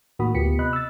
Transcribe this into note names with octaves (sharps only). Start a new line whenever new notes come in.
A2 D#3 A#3 F#4 B5 D#6
D2 B3 F4 G4 B6 C#7
C3 D#5 B5 F#6
E6 A6